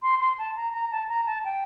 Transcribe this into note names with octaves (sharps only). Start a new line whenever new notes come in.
C6
C6
A5
A#5
A#5
A5
A#5
A5
G5